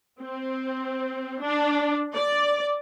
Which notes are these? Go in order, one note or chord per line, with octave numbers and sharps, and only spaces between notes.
C4
D4
D5